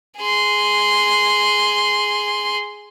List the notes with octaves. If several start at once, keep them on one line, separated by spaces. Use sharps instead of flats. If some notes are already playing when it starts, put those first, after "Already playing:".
G#4 C6